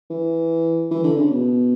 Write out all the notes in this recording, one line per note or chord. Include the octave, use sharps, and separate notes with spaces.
E3
E3
D3
C#3
B2